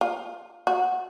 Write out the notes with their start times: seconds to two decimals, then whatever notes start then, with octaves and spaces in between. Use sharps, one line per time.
0.01 F4
0.67 F#4